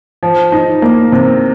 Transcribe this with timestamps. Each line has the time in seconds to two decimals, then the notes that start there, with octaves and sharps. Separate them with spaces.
0.23 F3
0.52 D#4
0.82 A#3
1.12 C3